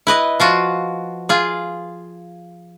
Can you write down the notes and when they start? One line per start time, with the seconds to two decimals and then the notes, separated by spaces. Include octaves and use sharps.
0.07 E4 B4 D#5
0.40 F3 F4 F#4
1.29 F4 G#4